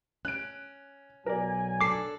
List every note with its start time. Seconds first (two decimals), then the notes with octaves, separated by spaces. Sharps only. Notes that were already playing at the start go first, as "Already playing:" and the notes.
0.25 C#4 F#6 D7
1.26 B1 F#3 A#4 D5 G#5
1.81 D4 A4 D6 C7